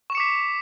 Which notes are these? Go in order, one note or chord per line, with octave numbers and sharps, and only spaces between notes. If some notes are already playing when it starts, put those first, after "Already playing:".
C#6 D6 B6 C#7 E7